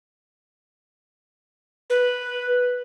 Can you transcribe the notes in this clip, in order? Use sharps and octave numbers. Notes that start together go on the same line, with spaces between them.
B4